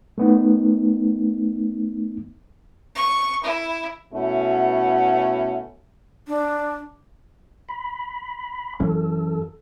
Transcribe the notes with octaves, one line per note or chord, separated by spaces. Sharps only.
A3 B3 D#4
C#6
E4
B2 A3 B3 C#4 E4 F#4
D4
B5
F#2 E3 C#4 A4